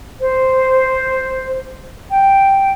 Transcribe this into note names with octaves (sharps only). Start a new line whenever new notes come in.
C5
G5